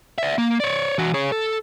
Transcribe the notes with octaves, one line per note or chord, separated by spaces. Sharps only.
D5 E5
A#3
C#5 D5
E3 F#4
G#4 C#5
A4